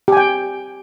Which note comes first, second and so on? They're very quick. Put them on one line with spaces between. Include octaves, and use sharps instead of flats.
G4 G#5 G5